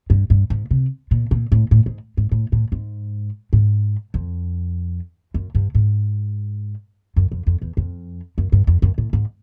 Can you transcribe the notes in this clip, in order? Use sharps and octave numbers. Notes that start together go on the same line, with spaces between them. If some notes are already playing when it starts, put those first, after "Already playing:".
G2
G2
G#2
C3
A#2
A#2
A2
A2
G#2
G#2
A2
A2
G#2
G#2
F2
F#2
G2
G#2
F#2
F2
F2
E2
F2
F#2
G2
F2
F#2
A2
G#2